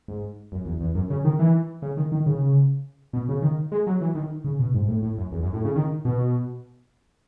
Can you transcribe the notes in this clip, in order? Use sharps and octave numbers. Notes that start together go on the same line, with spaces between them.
G#2
F#2
E2
E2
F#2
C#3
D#3
E3
C#3
D#3
D#3
C#3
B2
C#3
D#3
G#3
F#3
E3
D#3
C#3
B2
G#2
A2
A2
F#2
E2
F#2
A2
C#3
D#3
B2